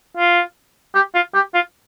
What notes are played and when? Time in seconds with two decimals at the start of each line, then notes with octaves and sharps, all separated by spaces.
0.17 F4
0.95 G4
1.15 F4
1.34 G4
1.54 F4